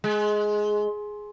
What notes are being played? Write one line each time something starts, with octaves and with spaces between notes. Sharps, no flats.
G#3